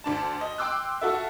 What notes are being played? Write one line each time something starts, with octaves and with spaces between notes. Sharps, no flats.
D2 D4 A5
D#5
G5 C6 D6 E6 F#6
F4 F#4 A4 E5